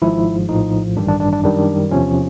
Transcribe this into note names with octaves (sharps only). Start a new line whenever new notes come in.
G#1 G#2 F3 E4
A#1 A2 F3 D#4
A1 G2 D#3 G3 D4
D4
D4
D4
F#2 D#3 G3 D4
E2 C3 F3 C#4